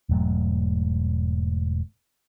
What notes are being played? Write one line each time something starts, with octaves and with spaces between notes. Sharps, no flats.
E1 G#2 F#3 A3